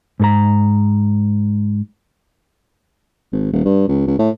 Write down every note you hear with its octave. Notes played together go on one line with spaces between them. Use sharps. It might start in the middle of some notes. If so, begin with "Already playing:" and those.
G#2 A4 A#5
G#1
D#1
G2
C#2
C#2
A2